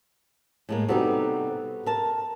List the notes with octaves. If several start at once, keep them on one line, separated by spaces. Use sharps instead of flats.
A2 G#3 A#3
C3 G3 B3 D#4 F#4 A4
A#4 A5